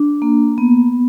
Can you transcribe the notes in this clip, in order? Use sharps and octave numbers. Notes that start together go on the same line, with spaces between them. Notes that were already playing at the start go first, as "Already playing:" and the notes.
Already playing: D4
A#3
B3